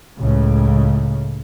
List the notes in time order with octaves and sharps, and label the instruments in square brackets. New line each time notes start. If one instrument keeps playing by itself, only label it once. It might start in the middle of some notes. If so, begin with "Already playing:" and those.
[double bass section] C#2 A2 C#3